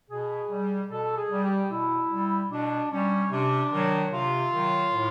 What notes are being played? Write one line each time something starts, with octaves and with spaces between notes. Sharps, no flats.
B2 G#4
G3
B2 A4
G#4
G3
G4
B2 E4
G3
B2 D4
G3 C#4
C3 D4
D#3 F#3
C3 F4
D#3 F#3
A2